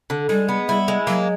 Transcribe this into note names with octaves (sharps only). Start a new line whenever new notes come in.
D3
G3 G#3
B3
G3 E4
G#3
F#3 A#3